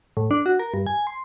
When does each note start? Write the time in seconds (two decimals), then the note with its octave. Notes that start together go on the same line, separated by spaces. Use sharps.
0.17 A2
0.31 D4
0.46 F#4
0.59 A#4
0.74 G2
0.86 G#5
1.07 C6